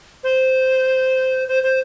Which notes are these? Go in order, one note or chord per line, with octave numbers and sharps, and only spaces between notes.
C5
C5
C5